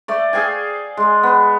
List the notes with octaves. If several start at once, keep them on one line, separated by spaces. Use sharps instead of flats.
A3 D5
G#4 F5 G5 G#5
G#3
B3